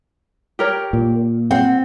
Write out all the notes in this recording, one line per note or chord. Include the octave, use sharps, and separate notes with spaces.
G4 A#4 C#5
A#2
C4 F#5